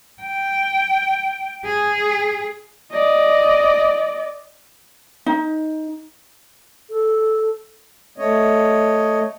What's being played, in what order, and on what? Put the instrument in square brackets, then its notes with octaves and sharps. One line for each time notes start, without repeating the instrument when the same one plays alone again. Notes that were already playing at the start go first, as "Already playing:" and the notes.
[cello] G5
G#4
[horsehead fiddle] D5 D#5
[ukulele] D#4
[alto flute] A4
[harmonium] A3 C#5 D#5